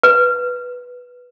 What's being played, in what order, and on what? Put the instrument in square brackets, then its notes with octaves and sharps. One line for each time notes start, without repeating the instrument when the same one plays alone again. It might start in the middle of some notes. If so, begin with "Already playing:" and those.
[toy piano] B4